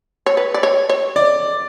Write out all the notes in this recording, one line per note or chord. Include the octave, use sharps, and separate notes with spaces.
C#5
B4
D5
C#5
C#5
D5